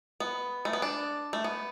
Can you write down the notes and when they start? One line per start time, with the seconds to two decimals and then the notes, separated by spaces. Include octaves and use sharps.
0.20 B3
0.65 A3
0.73 B3
0.82 D4
1.33 A3
1.44 B3